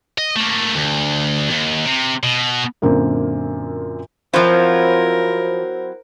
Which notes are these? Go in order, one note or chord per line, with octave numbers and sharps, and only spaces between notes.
D#5
A3 A#3
D2
D#2
C3
B2
F#2 A#2 D3 A#3 C4
F3 F#3 C4 E4 F4 A#4 C5